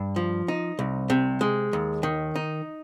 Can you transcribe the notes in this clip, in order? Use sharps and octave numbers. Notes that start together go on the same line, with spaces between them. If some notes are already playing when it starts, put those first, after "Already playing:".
Already playing: G2
F3
D#4
C2
C3
G#3
D#2
D#3
D#4